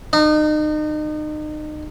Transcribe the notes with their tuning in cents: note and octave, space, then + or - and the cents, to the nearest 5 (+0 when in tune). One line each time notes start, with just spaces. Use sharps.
D#4 -35